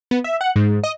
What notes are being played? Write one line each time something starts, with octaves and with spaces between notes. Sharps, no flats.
B3
E5
F#5
G#2
D#5